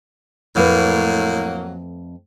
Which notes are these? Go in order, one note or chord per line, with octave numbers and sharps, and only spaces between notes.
F2 A2 F#3 A3 A#3 B4